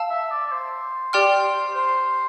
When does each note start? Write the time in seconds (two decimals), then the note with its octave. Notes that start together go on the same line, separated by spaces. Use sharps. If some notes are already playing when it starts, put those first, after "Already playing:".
Already playing: F5 A5 E6
0.10 E5
0.31 D5
0.45 D5
0.51 C5
1.13 G4 D5 G5 C6 F6
1.75 C5